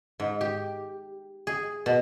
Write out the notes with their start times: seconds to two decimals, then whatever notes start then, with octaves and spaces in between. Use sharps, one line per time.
0.20 G#2
0.41 G4
1.47 G#4
1.86 B2